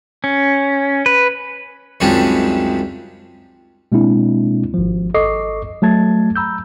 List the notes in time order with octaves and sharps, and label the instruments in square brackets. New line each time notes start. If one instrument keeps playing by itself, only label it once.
[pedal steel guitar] C#4
B4
[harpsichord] C#2 F#2 C3 D#3 G3 D4
[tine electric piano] B2 G#3 A#3 C4 D4 E4
G#1 F3
G#1 A4 D#5 C#6 D6 C7
F#3 A3 A5 G#6 A6
A#5 B5 E6 G6